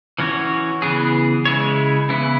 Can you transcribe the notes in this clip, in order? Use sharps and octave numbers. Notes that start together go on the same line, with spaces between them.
E3 C#4 F#4 C#5
C#3 E3 B3 G#4
C#3 G#3 E4 C#5
C#3 E3 B3 E4